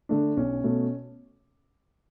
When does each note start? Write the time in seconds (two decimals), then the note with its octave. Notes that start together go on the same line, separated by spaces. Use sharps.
0.09 D3 A3 D4
0.37 B1 C#4
0.64 B2 A3